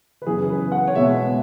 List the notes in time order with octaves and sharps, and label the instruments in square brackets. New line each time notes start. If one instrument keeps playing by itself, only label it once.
[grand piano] B4
F#2 C#3 E3 B3 G#4
B4
F#5
C#5
B2 G#3 B3 E5